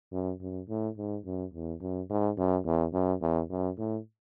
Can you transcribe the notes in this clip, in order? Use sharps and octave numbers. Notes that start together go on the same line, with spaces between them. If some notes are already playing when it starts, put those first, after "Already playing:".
F#2
F#2
A2
G#2
F#2
E2
F#2
G#2
F#2
E2
F#2
E2
F#2
A2